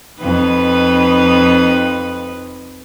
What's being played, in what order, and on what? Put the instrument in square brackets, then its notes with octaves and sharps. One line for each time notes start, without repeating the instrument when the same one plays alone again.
[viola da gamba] F2 D#4 B4